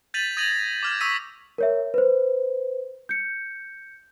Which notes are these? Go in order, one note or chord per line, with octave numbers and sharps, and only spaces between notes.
G6 A6 B6 D#7 F7 F#7
D#6 G#6 A#6 D#7 F7 F#7
D6 F6 G#6
C#6 D#6 E6 B6 D#7
A#4 C#5 E5
B4 C5
G6 C#7